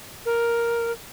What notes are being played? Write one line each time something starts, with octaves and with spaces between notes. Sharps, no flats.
A#4